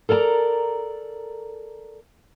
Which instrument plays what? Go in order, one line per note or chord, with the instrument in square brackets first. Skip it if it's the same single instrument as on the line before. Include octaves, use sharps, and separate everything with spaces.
[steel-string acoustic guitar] A4 A#4 D5 A5 A#5